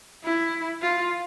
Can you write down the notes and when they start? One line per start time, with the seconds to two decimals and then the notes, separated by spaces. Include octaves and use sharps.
0.24 E4
0.82 F4